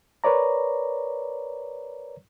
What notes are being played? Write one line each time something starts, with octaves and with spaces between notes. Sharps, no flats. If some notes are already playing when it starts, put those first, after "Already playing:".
A#4 B4 C#5 D5 A#5